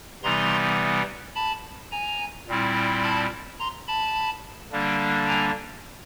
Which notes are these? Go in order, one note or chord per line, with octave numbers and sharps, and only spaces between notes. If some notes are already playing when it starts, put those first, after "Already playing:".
C3 E3 G3 B3 D#4 A#5 C6
A5 B5
G#5 A#5
A#2 G3 C4 E4
A5 B5
A#5 C6
A5 B5
D3 G3 A#3 D4
G#5 A#5